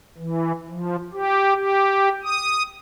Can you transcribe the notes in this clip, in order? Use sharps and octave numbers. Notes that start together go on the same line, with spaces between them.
E3
F3
G4
G4
D#6